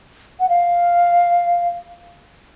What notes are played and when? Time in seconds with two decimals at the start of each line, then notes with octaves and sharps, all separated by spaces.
0.40 F#5
0.49 F5